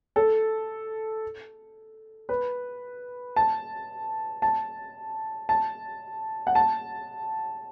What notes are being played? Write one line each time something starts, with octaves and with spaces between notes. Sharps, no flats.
A4
B4
A5
A5
A5
F#5
A5